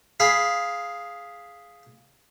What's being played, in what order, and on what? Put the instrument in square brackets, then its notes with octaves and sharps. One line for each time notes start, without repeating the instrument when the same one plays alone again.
[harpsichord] G#4 F5 B5